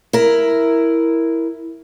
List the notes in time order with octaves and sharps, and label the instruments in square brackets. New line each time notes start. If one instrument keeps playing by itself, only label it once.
[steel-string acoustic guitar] E4 A#4